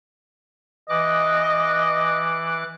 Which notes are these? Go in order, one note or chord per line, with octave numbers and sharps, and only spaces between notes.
E3 D#5 D6 F#6